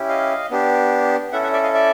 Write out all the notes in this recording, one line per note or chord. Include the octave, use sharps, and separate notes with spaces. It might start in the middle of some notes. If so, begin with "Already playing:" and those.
Already playing: C#4 E4 G4
D#5 F5
B3 D4 G4
C#4 E4 A4 E5 F#5
E5 F#5
D5 E5
D#5 F5
D5 E5